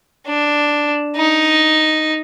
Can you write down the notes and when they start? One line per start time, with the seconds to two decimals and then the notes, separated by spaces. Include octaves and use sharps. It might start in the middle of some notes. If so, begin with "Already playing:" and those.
0.26 D4
1.16 D#4